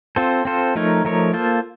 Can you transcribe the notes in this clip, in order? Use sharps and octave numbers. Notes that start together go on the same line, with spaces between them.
C4 F4 A4 C5
C4 F4 A4 C5
F3 A3 D#4 A#4 C#5
F3 A3 D#4 A#4 C#5
A#3 F4 A4 C5